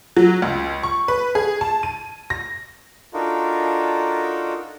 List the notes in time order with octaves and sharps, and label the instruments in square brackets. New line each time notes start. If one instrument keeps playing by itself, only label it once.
[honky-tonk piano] F#3
C#2
C#6
B4
G#4
A5
D#7
A#6
[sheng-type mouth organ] D4 D#4 F4 F#4 A4 A#4